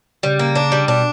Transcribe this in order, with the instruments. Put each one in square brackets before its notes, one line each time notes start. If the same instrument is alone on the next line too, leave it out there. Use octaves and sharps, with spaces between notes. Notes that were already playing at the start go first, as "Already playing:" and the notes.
[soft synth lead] C#3 [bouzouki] G3
[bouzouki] A#3
D4
G3
[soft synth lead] B2 [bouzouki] D4